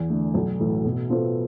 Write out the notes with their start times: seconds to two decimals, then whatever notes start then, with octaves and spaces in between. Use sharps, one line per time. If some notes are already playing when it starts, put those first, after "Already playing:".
Already playing: E2
0.10 D3 A3
0.34 B1
0.59 A2 E3 A3
0.85 B2
1.10 B3 F4 A4 C5